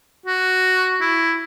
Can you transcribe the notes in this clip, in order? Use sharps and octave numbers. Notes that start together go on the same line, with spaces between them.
F#4
E4